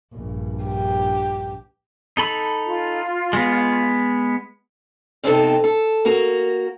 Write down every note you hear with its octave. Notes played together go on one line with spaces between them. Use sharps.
A#1 G2
G4
D#4 A4 B5
F4
G#3 B3
F2 C3 B3 C4 D#4 A4
A4
A#3 F#4 A#4